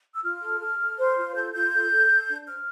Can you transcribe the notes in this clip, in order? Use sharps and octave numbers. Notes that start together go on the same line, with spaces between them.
E6
F4 F6
A4
A4
A4
C5
F4
A4 G6
F4 G6
A4
A4
A4
D4
C5 F6